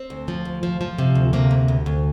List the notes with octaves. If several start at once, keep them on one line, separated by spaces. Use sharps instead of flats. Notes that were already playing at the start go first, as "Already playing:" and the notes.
Already playing: C4
D2
F3
D2
F3
F3
C3
D2
C3 A#3
D2
D2
D2